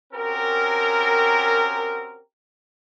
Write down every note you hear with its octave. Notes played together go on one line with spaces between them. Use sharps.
C4 C#4 F#4 G4 A#4